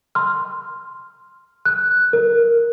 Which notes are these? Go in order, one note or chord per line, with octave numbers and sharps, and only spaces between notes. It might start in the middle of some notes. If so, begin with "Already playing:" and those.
C6 F6
F#6
A#4